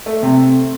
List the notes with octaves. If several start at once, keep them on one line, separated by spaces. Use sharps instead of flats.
A3
C3